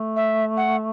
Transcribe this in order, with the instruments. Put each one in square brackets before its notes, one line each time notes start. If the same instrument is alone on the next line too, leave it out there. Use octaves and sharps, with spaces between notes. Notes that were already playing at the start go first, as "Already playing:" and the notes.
Already playing: [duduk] A3
[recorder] E5
F#5